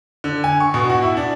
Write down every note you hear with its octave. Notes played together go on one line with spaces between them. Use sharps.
D3
G#5
C#6
B2
F#4
E4
D4